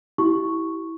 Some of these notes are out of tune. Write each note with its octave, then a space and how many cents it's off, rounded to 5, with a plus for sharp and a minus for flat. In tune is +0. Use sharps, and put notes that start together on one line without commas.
E4 -10 G4 -25 C#6 +0